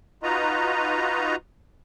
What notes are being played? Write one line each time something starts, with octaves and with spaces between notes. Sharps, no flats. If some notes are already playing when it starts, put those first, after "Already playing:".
D#4 F4 F#4 B4 D#5 A#5